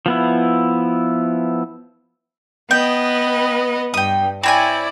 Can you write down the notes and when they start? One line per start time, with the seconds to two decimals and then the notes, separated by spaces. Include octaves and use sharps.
0.06 F3 B3 E4
2.71 B3 B4 D#5 G5
3.94 G2 G5 D#6
4.43 C4 E4 C#5 D5 G#5